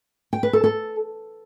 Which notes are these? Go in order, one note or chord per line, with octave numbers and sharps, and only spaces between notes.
G5
B4
A4
A4